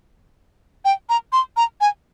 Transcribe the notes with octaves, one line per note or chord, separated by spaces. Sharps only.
G5
A#5
C6
A#5
G#5